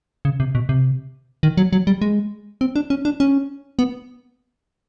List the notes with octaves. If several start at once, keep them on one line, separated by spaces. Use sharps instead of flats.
C#3
C3
B2
C3
D#3
F#3
F#3
G3
G#3
C4
D4
C#4
D4
C#4
B3